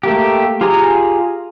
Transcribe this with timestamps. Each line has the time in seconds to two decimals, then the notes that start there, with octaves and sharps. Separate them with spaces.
0.03 A3 A#3 G4
0.61 F4 G4 G#4 G#5 A#5